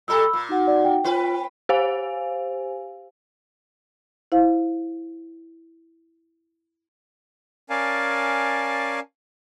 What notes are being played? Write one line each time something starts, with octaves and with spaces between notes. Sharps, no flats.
A#2 G3 A4 B5 E6
A#2
D#4 F#4 F#5
D5
G5
C4 F4 B4
G4 C5 F5 G#5
E4 C5 F5
C#4 A#4 D5 F5 G#5 A5